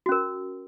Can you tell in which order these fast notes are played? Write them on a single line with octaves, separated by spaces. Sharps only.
F#4 C#4 A#4